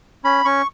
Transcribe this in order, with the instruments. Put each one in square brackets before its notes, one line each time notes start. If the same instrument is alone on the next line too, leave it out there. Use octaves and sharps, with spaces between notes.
[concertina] C#4 B5
C#4 C#6